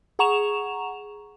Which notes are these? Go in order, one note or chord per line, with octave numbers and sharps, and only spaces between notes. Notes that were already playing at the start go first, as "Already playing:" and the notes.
G#4 F#5 A#5 C#6 E7 F7